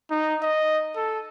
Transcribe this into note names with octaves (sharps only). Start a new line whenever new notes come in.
D#4
D#5
A4